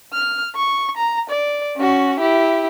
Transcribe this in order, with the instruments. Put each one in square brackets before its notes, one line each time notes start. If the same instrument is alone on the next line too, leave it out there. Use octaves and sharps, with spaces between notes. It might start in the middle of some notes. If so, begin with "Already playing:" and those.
[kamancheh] F6
C#6
A#5
D5
C#4 F#4
E4 G4